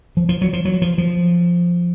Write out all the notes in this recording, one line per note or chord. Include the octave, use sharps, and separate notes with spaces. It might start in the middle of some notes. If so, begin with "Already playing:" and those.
F3
F3
F#3
F3
F#3
F3
F3